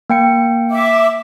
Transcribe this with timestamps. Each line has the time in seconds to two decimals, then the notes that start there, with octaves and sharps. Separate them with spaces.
0.10 A#3 G5 C#7
0.71 E5 D6